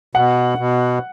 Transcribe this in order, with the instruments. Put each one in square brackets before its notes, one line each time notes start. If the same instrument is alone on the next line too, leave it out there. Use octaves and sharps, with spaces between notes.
[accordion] B2 [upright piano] F#5
[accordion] B2